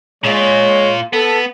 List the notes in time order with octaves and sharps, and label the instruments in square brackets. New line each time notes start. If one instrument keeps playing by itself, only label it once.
[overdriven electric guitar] A#2 F4 [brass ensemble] G#3 C#5
[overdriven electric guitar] B3 [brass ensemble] A4